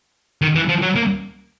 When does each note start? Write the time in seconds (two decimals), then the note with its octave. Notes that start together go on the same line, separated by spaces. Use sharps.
0.42 D#3
0.55 E3
0.69 F3
0.82 F#3
0.96 A#3